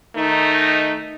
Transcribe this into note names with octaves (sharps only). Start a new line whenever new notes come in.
D#3 A3 D#4